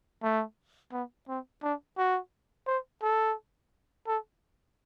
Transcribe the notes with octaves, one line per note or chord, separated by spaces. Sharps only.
A3
B3
C4
D4
F#4
C5
A4
A4